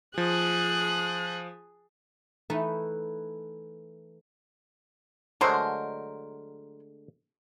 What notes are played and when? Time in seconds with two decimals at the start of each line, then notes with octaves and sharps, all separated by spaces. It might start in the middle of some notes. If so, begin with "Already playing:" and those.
0.18 F3 G#4 F#6
2.50 E3 A3 D#4 E4 B4 A5
5.41 D3 F#3 G#3 A3 A#4 C5